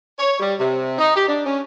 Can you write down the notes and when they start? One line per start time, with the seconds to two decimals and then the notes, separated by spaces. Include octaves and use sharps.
0.19 C#5
0.40 G3
0.60 C3
0.99 D#4
1.16 G4
1.28 D4
1.46 C#4